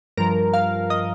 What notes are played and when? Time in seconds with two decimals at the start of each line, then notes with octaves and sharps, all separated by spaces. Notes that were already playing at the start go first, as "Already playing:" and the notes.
0.17 G2 F3 A#4
0.54 F5
0.90 D#5